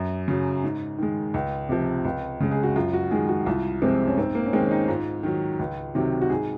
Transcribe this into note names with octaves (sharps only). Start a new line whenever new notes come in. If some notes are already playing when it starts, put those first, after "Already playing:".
Already playing: F#2
C#3 F#3
G#2
D#3 G#3
C#2
C3 F3
C#2
C#3 G#3
G#4
F#4
F#2 F4
F#4
D#3 G#3 G#4
F#4
C2 F4
C3 F3 G#3 C4
C#4
G#2 C4
A#3
C#4
D#3 G#3 C4
C#4
D#4
G#2 F4
D#3 F#3
C#2
C3 D#3 F#3
F#4
G#2 G#4